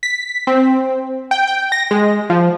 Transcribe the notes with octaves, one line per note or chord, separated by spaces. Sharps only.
B6
C4
G5
G5
A#6
G#3
F3